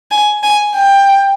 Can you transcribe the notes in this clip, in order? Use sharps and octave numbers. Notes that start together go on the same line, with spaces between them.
G#5
G#5
G5